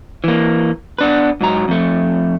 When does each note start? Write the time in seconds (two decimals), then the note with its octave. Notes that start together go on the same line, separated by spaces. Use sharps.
0.24 E3 A#3
0.99 B3 D4 B4
1.41 G#2 F#3 A#5
1.68 F2 A3